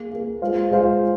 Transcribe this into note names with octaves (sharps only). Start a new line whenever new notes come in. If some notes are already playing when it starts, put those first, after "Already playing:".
Already playing: A#3 G#4 F5
A#3 G#4 F5
G#3 F4 C5 F5
G#3 F4 C5 F5